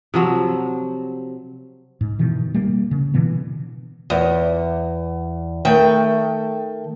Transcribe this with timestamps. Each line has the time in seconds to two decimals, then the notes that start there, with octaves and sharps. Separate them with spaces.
0.14 C3 F3 F#3
2.01 G#2
2.19 B2 D#3 E3
2.54 G3 A#3
2.91 C#3
3.14 B2 D3 E3 B3
4.10 E2
5.65 D#3 A3 G5